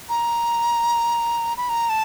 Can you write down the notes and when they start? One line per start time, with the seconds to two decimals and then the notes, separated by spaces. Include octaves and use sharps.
0.09 A#5
1.57 B5
1.69 A#5
1.89 A5